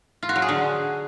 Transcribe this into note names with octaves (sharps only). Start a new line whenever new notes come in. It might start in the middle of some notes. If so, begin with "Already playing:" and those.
F4
F#4
F#3
G#4
D3